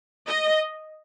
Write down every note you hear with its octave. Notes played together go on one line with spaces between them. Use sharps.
D#5